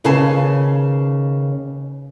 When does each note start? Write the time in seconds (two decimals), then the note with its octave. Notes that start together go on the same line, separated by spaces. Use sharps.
0.04 D#2 C#3 B4 F5 G#5 A5